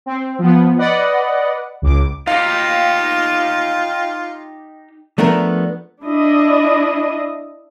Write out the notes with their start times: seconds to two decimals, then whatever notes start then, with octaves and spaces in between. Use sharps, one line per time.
0.06 C4
0.39 F3 B3
0.78 B4 D5 D#5 F#5
1.82 C#2 D6
2.27 D#4 F4 G4 F5
5.18 F3 A3 B3 D4 A#4
6.03 D4 E4 D#5